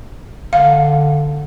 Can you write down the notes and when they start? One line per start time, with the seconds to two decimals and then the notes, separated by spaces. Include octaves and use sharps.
0.53 D3 F5